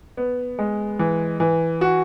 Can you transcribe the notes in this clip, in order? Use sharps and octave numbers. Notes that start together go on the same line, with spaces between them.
B3
G#3
E3
E3
F#4